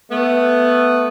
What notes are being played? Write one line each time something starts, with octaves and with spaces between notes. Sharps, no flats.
A3 B3